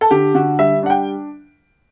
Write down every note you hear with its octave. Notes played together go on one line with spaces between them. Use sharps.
A4
D3 G4
D3 F#4
G3 E5
D4 F#5
G5